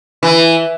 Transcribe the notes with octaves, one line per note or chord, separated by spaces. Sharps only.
E3